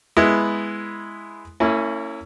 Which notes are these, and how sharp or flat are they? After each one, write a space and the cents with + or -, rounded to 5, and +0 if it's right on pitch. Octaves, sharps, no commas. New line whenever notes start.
G#3 +0 B3 +0 E4 +0
A#3 -45 C#4 +0 E4 +0